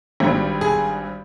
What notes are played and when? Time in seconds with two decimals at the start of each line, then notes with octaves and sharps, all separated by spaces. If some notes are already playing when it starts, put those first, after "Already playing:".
0.20 G#1 G2 G3
0.61 G#4